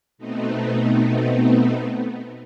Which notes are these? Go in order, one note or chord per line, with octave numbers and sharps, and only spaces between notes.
B2 A3 B3 C4 D#4